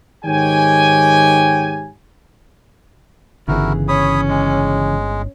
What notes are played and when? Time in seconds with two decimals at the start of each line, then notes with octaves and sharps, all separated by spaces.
0.25 G#2 D#3 G4 C#5 G5 G#5
3.48 G1 C#3 E3 E4 F#4 G#4 A#4
3.88 C#4 C#5 B5 D#6
4.28 G#3